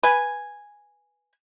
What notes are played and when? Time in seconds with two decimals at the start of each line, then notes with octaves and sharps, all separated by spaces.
0.03 B4 G#5